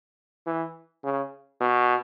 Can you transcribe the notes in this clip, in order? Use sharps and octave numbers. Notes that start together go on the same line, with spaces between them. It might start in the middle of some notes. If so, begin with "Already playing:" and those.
E3
C#3
B2